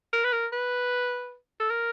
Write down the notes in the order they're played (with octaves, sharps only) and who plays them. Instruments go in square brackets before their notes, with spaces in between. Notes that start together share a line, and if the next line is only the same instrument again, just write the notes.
[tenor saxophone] A#4
B4
A#4
B4
A4
A#4